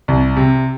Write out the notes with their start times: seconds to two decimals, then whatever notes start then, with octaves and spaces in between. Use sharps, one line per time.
0.08 C2
0.36 C3